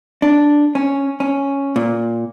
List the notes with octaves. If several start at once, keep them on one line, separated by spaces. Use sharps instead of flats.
D4
C#4
C#4
A#2